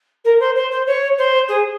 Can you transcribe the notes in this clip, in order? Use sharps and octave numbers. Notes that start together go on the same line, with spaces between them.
A#4
C5
C5
C5
C#5
C5
G#4